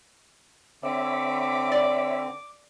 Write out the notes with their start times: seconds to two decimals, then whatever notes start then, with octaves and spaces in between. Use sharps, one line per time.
0.83 D3 C4 C#5 E5 B5 D6
1.72 D5